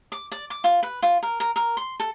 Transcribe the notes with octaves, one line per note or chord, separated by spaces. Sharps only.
D6
D5
D6
F4
B4
F4
A#4
A#4
A#4
C6
A4